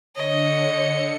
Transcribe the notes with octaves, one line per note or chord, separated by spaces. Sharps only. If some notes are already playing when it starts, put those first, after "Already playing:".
D3 C#5 D#5 C#7